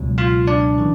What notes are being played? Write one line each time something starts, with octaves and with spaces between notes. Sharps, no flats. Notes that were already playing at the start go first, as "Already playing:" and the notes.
Already playing: C#2 B2 F#3
F4 F5
D4 D5
C#3 E3